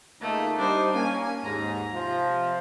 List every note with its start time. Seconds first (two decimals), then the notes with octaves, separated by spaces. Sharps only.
0.22 C#2 A3 A#3 D#4
0.58 G3 D4 D#4 C5
0.93 A#3 C#4 G#5
1.44 D#2 G#2 A#5
1.94 C3 F3